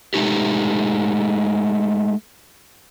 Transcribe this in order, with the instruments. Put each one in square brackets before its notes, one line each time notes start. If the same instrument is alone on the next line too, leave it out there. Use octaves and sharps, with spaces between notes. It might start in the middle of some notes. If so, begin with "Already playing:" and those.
[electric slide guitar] G#3 A3 D#4 G4